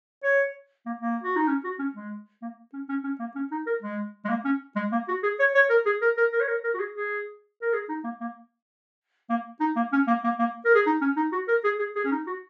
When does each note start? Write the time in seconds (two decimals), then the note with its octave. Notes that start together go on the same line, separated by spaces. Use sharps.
0.23 C#5
0.86 A#3
1.02 A#3
1.23 F#4
1.36 D#4
1.48 C#4
1.65 F#4
1.79 C#4
1.95 G#3
2.42 A#3
2.73 C#4
2.89 C#4
3.04 C#4
3.20 A#3
3.35 C#4
3.51 D#4
3.66 A#4
3.82 G#3
4.25 G#3
4.29 A#3
4.45 C#4
4.76 G#3
4.92 A#3
5.08 F#4
5.23 G#4
5.40 C#5
5.55 C#5
5.70 A#4
5.86 G#4
6.02 A#4
6.17 A#4
6.33 A#4
6.40 C#5
6.48 A#4
6.64 A#4
6.75 F#4
6.80 G#4
6.95 G#4
7.62 A#4
7.73 G#4
7.89 D#4
8.04 A#3
8.21 A#3
9.30 A#3
9.60 D#4
9.76 A#3
9.93 C#4
10.08 A#3
10.24 A#3
10.39 A#3
10.65 A#4
10.75 G#4
10.86 D#4
11.02 C#4
11.17 D#4
11.33 F#4
11.48 A#4
11.64 G#4
11.79 G#4
11.96 G#4
12.05 C#4
12.11 D#4
12.27 F#4